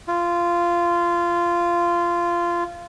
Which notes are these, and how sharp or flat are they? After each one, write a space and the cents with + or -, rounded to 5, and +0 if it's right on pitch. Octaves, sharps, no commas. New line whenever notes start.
F4 -15